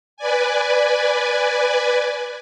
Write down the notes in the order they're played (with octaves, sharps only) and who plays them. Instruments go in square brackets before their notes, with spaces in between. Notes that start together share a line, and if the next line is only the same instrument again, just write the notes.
[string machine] B4 D5 G#5